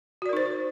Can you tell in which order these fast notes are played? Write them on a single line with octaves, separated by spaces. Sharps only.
F#4 D5 A#4 D#4 C5